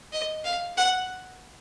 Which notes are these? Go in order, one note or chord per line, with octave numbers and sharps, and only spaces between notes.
D#5
F5
F#5